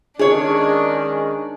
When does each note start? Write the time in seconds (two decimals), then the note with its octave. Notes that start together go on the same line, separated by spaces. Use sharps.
0.19 D#3 G#3 C#4 D4 G#4 C#5